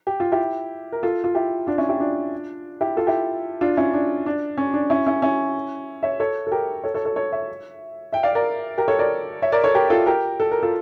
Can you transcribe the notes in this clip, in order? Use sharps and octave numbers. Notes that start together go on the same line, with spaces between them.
G4
F4
E4 G4
A#4
F4 A4
F4
E4 G4
D4 F4
C#4 E4
E4 G4
D4 F4
E4 G4
F4 A4
E4 G4
D4 F4
C#4 E4
D4
D4
C#4
D4
C#4 E4
C#4 E4
C#4 E4
C#5 E5
A4 C#5
A4
G4 A#4
A4 C#5
A4 C#5
A4 C#5
A4 C#5
C#5 E5
E5 G5
D5 F5
A#4 D5
G4 A#4
A4 C#5
A#4 D5
C#5 E5
A#4 D5
A4 C#5
G4 A#4
F4 A4
G4 A#4
A4
A#4
F4 A4